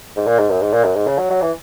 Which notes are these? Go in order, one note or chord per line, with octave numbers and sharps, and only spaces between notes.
G#2
A#2
G#2
F#2
G#2
A#2
F#2
G#2
C#3
F#3
F#3
E3